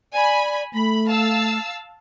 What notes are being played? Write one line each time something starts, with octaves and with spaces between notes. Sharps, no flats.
D5 G#5 B5
A3 B5
F5 A5 E6